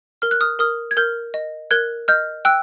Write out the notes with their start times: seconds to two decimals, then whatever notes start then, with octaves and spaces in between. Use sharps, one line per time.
0.22 A#4 F6
0.31 F#6
0.41 D#6 F6
0.59 A#4 D#6 F6
0.91 G#6
0.97 A#4 F6 G6
1.34 D#5
1.71 A#4 F#6 G#6
2.08 D#5 F6 G6
2.45 G5 E6 F#6